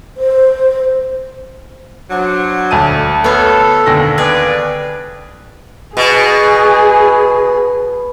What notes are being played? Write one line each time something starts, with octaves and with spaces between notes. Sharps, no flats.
C5
F#3 D4 C5
D2 A5 D#7
B3 A4 C#5 F5
D#2 D3 A#6
G#4 B4 D5
B2 G#4